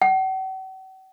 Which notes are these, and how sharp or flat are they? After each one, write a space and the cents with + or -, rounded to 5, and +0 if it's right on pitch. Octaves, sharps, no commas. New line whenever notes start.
F#5 +45